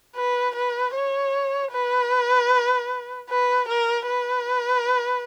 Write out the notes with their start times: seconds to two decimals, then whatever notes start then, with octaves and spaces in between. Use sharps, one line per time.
0.15 B4
0.55 B4
0.94 C#5
1.72 B4
3.29 B4
3.68 A#4
4.07 B4